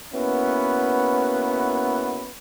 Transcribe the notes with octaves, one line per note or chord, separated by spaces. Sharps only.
A#3 B3 C#4 E4 F#4 B4